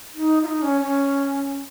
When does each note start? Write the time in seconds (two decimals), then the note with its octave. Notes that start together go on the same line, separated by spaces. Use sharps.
0.14 D#4
0.43 F4
0.46 D#4
0.62 C#4
0.81 C#4